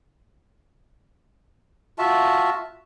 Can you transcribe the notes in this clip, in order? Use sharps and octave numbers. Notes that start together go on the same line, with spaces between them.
F4 F#4 E5 A5